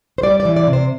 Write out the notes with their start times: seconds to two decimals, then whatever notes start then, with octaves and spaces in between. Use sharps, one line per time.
0.18 C5
0.23 G3 D5
0.40 D5
0.45 E3
0.56 D5
0.67 C3
0.73 C5